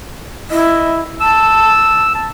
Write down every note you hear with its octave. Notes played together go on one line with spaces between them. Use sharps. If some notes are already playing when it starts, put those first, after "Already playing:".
E4 D#5
A5 E6
A5